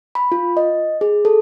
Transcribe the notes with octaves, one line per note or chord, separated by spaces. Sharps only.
B5
F4
D#5
G#4
A4